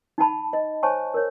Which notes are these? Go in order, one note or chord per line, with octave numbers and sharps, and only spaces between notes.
D#4 F#5 A5 B5
D#5
C5 C#5 G#5 A5 C#6
A#4 C#5